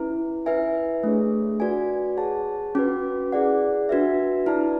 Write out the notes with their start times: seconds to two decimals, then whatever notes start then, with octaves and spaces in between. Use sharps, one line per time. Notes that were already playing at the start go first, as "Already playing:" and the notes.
Already playing: C#4 E4 B4
0.46 E4 B4 E5 G#5
1.03 A3 D4 G#4 C#5
1.60 F#4 B4 D5 G#5
2.17 G#4 C#5 F#5 A5
2.75 C#4 F#4 B4
3.32 E4 G#4 D5 F#5
3.89 D4 F#4 B4 E5
4.46 E4 B4 D5 A5